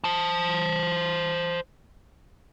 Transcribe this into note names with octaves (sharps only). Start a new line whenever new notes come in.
C5 A5